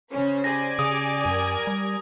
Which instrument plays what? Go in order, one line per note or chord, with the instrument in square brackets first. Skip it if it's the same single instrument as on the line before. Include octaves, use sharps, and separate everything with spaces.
[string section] C#3 C5 [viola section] C#4
[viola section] G4 D5 G#5 [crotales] A#6
[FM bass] C#3 [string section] D6 [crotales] D#6
[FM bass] F#2 [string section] A#4 G#6
[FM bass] G3